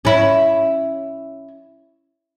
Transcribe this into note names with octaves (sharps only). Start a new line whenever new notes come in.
C#4 E4